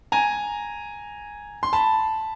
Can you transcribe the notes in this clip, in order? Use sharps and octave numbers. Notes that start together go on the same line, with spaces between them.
G#5 A#5
C6
A5 B5